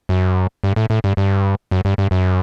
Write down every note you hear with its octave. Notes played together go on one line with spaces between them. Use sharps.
F#2
G2
A2
A2
G2
G2
F#2
G2
G2
F#2